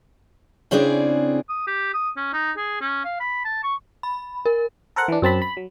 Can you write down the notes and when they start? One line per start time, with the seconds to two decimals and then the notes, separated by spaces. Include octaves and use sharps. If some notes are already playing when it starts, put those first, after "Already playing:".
0.71 C#3 C4 D4 E4 G#4 D5
1.49 D#6
1.67 G4
1.94 D#6
2.17 C#4
2.34 D#4
2.57 G#4
2.81 C#4
3.05 F5
3.20 B5
3.45 A5
3.63 C#6
4.03 B5
4.46 A#4
4.96 A4 A#4 C5 F#5
5.08 E3 D4
5.22 F#2 C4 A5 B5
5.42 B5
5.57 F#3